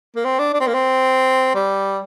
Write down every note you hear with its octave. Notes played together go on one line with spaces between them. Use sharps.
A#3
C4
D4
D4
C4
A#3
C4
G3